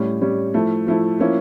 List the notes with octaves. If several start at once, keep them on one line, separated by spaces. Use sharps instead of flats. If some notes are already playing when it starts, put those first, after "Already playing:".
Already playing: A2 G3 C#4
A2 G3 C#4
F3 A3 E4
F3 A3 E4
F3 A#3 C#4 E4